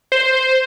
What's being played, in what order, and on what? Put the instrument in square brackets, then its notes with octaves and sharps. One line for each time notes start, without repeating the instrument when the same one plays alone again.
[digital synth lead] C5